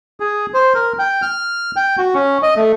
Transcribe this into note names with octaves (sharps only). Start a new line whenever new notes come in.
G#4
C5
A#4
G5
F6
G5
F#4
C#4
D#5
A3